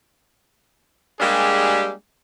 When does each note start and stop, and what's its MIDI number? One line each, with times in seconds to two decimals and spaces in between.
1.20 1.91 55
1.20 1.91 56
1.20 1.91 58
1.20 1.91 62
1.20 1.91 67
1.20 1.91 68